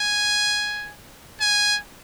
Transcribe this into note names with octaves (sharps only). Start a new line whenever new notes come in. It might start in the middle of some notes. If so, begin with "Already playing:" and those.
Already playing: G#5
G#5